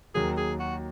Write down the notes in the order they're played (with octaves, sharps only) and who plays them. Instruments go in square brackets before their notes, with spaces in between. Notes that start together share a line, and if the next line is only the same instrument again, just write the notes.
[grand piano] D#2 D#3 F#3 [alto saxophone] G#4
[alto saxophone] G#4
F#4